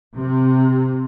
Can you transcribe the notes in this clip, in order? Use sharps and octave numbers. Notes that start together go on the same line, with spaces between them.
C3